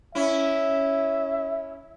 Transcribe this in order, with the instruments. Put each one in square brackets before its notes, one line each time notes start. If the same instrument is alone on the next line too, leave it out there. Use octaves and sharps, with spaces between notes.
[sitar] C#4 E4 [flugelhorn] E5